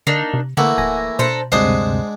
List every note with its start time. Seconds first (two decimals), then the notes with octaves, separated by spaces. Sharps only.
0.07 D3 A#3 D4 D#4
0.34 C3
0.57 D3 E3 A3 A#3 F#4
0.78 D1 G#5 A#6
1.19 B2 D4 A4 C5 A#5
1.52 D2 G2 C3 G#3 D4 C5 F#5 D#6